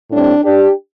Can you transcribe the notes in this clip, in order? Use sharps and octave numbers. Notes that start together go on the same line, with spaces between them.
A2 G3 C4 D4
D4 G4